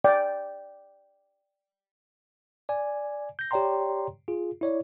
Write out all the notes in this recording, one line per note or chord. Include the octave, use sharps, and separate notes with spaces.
D5 G5
D5 G#5
G6 A#6
G4 C#5 D5 G5 A#5 C6
F4 G#4
E4 C#5 D5